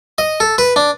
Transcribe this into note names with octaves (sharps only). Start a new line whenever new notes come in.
D#5
A4
B4
D4